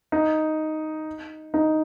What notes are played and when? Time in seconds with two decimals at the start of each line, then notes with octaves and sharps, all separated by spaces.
0.12 D#4
1.54 D#4